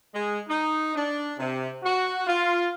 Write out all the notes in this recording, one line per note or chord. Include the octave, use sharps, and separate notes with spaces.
G#3
D#4
D4
C3
F#4
F4